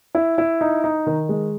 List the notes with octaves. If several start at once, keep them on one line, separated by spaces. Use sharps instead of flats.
E4
E4
D#4
D#4
D#3
G#3